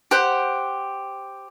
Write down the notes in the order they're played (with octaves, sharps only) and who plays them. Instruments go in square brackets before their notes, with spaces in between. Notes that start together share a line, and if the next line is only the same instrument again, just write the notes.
[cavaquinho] G4 C5 F#5